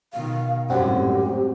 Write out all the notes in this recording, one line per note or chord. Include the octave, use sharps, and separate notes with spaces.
B2 D#3 F5
G#1 F#2 A2 G3 C4 F#4 G4